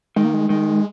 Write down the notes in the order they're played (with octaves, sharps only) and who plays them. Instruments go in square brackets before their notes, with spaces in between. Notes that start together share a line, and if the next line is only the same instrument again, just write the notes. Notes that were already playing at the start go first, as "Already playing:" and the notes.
[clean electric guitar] D#3 [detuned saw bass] G#3
[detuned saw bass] A#3
G#3
[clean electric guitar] D#3 [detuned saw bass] G#3